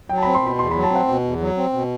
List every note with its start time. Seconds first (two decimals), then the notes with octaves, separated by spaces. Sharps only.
0.09 F#3 G5
0.18 A5
0.23 C4 B5
0.35 C6
0.42 B2 B5
0.59 E2 C6
0.71 B5
0.76 F#3
0.83 A5
0.91 C4 F#5
1.08 B2
1.24 E2
1.40 F#3
1.58 C4
1.73 B2